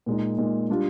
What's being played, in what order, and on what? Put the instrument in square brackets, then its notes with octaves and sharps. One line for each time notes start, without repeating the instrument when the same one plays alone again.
[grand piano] A#2 G#3 D#4
A#2 G#3 D#4
G3 D4 F4